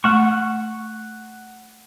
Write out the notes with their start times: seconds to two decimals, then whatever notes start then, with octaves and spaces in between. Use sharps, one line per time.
0.04 A3 F#5 C#6